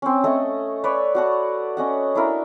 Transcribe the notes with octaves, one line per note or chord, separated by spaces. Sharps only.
C4 C#4
A3 C#4 A4 D#5
B4 C#5 D5
F#4 F#5 A5
C#4 D#5 F#5
D4 E4 A#4